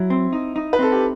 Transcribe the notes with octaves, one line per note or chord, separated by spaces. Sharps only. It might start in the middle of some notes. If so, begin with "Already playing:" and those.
Already playing: F#3 E4
C4
D#4
D#4
B4
C4 A4
G4